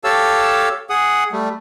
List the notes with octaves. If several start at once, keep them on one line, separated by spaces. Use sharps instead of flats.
G4 A4 C#5 F5 A5 E6
G#4 F#5 D#6
G3 A3